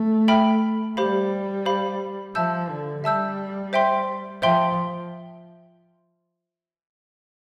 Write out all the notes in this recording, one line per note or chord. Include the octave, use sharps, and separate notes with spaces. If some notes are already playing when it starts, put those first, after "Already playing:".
Already playing: A3
E5 G5 B5 F6
G3 G4 C5 F5 B5
G4 C5 F5 B5
F3 E5 A5 E6 G6
D3
G3 E5 A5 E6 G6
C5 E5 G5 C6
F3 C5 E5 G5 C6